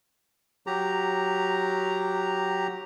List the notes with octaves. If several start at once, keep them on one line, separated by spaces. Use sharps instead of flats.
F#3 G4 A#5